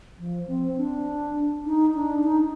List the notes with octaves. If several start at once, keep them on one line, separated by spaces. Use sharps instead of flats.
F3
C4
D4
D#4
D4
D#4